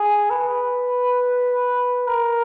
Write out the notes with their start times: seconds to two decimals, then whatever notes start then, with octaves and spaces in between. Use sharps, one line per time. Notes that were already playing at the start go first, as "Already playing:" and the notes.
Already playing: G#4
0.30 B4
2.07 A#4